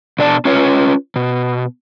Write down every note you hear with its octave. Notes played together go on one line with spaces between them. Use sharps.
B2 D4 D5 A5
C#4 F4 B4 C#5
B2